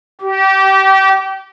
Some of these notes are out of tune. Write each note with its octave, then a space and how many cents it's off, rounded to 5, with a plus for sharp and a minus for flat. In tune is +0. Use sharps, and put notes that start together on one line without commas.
G4 -30